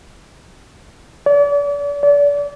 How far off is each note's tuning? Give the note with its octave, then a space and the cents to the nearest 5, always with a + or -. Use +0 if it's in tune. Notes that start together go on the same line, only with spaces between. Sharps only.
D5 -40
D5 -35